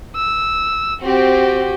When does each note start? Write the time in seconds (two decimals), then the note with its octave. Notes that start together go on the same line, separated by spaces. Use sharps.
0.16 E6
1.03 C4 F#4 G4